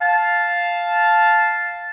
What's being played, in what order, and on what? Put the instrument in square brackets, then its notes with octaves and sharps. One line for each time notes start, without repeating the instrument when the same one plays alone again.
[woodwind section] F5 A5